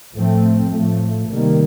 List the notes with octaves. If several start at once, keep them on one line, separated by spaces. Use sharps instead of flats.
A2 F3 A3 C4
A2 F3 A3
C3 D#3 G3 A#3